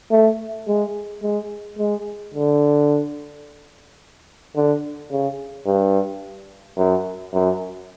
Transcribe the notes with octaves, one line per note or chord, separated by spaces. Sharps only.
A3
G#3
G#3
G#3
D3
D3
C#3
G2
F#2
F#2